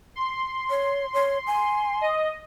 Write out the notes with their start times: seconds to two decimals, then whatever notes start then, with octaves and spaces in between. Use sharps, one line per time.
0.15 C6
0.70 C#5
1.14 C#5
1.47 G#5
2.01 D#5